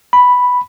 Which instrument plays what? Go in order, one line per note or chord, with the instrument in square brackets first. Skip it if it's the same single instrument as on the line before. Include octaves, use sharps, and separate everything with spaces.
[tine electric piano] B5